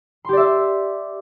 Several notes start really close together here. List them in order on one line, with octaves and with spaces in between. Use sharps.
C6 G4 D5 E5